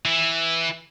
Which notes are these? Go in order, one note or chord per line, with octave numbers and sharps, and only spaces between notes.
E3